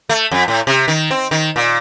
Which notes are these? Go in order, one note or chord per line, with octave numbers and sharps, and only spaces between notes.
A3
F2
A2
C3
D#3
C4
D#3
A#2